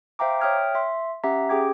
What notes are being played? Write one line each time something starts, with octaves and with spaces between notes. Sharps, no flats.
C5 E5 F5 G5 A#5 D6
C#5 E5 G5 D#6 F6 G#6
E5 C6
C#4 G4 E5 F#5 A#5
C#4 G4 G#4 G5 D6 G#6